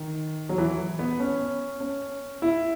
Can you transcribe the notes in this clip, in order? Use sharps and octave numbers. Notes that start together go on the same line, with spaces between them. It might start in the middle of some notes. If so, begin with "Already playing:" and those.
Already playing: D#3
F#3
E3
B3
C#4
C#4
E4